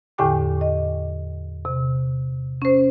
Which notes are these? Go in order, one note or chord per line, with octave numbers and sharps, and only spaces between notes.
E2 A2 D3 G4 G5 D6
D#5
C3
C#4 C5